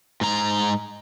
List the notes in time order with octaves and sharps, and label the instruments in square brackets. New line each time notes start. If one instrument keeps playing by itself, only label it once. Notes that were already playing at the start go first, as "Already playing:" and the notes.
[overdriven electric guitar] G#2 A#5